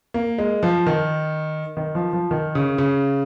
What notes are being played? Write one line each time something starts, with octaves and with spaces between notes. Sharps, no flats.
A#3
G#3
F3
D#3
D#3
F3
F3
D#3
C#3
C#3